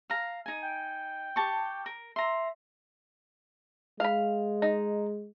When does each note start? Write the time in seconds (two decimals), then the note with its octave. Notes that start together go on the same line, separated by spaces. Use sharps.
0.10 F5 A#5
0.46 D#4 G#5
0.62 G5
1.36 G4 A5 C#6
1.86 A#4
2.16 E5 A#5 C6
4.00 G#3 F5 B5
4.62 D#4